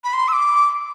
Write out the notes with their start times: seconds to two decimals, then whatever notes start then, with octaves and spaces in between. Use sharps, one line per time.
0.04 B5
0.13 C6
0.28 E6
0.33 D6